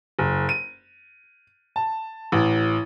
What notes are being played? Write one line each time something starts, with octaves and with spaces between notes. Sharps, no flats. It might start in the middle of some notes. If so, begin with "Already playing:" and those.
F#1
D#7
A5
A1